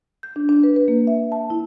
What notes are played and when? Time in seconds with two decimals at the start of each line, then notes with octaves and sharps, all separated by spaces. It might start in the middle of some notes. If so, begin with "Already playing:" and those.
0.23 G6
0.36 D4
0.49 D4
0.64 B4
0.76 B4
0.88 A#3
1.07 E5
1.32 A5
1.50 E4